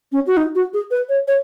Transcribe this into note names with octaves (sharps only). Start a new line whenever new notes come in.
C#4
F#4
D#4
F#4
G#4
B4
C#5
C#5